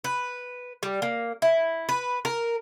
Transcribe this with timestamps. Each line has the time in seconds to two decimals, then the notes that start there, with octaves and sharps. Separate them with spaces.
0.04 B4
0.83 G3
1.02 A#3
1.42 E4
1.89 B4
2.25 A#4